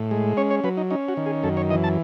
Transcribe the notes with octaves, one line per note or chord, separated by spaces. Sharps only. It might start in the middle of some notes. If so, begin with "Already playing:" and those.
Already playing: A2
G#3
C#4 C#5
C#5
F#3 B4
D#4
C#4 D#4
F#4
D#3
G#4
F#2 A4
C#5
E3 D#5
A5